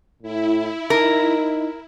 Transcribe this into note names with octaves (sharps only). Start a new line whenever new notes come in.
A2 E4
D#4 A#4